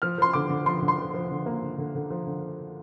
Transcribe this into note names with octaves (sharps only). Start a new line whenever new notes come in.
F3 F6
F3 C6
D3 D6
D3
F3 C6
D3
C6
F3
F3
D3
A#3
D3
D3
D3
F3
D3